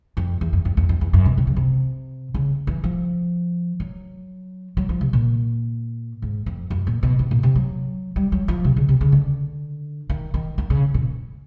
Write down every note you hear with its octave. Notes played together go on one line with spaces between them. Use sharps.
F2
E2
F#2
F2
E2
F2
E2
F#2
B2
C3
C#3
C3
C#3
E3
F3
F#3
F#3
F3
C3
A#2
G#2
F2
F#2
A#2
B2
C3
A#2
C3
F#3
G3
F#3
F3
C3
C#3
C3
C#3
D3
D#3
D#3
D#3
C#3
A#2